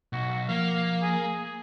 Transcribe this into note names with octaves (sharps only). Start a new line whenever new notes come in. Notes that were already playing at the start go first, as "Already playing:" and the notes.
B1 F#4
F3 A#3 F5
G#4